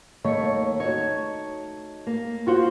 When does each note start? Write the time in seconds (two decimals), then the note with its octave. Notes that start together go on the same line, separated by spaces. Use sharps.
0.24 D#2 D#3 A3 C#5 C#7
0.80 D#4 F#4 C#5
2.07 A#3
2.47 F4 F#4 C5